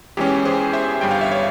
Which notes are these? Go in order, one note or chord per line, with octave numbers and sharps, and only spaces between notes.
E2 E3 G#3 C#4 G4
G#4 C5
C5 E5
G1 G2 G3 G5
F5
E5
C#5 F5